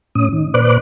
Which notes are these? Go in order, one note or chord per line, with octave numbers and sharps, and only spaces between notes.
A2 C#4 D#6
D#3
A#2 B4 C5 D5 D6 F#6